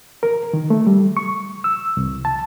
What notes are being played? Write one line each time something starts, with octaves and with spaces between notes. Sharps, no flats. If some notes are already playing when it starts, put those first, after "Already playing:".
A#4
D#3
A3
G3
C#6
E6
C2
A5